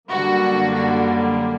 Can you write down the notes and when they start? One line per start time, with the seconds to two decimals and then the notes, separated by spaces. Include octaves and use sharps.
0.10 F#2 D3 G3 A#3 F#4
0.74 F#4